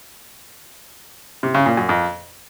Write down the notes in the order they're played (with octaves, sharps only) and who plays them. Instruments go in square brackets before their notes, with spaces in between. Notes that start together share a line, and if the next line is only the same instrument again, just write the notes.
[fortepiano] C3
C#3
A#2
F#2
F2